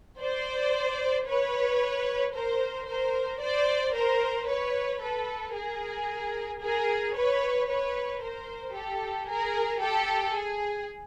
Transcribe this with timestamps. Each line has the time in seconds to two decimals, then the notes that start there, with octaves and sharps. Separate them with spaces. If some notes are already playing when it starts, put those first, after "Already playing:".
0.20 C5 D5
1.27 B4 C#5
2.34 A#4 C5
2.87 A#4 C5
3.41 C5 D5
3.94 A#4 C5
4.47 B4 C#5
5.01 A4 B4
5.54 G#4 A#4
6.60 G#4 A#4
7.14 B4 C#5
7.67 B4 C#5
8.21 A#4 C5
8.75 G4 A4
9.28 G#4 A#4
9.81 G4 A4
10.35 G#4